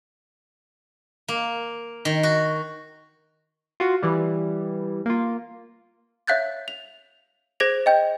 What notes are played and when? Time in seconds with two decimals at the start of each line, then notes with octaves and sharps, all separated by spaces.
1.28 A#3
2.05 D#3
2.23 F#4
3.80 F4 F#4
4.03 E3 G3
5.06 A#3 F4
6.27 C#5 E5 F5 F#6 G6 A6
6.68 F7
7.60 G#4 C5 G#6 A#6 D7 F7
7.86 D#5 G5 G6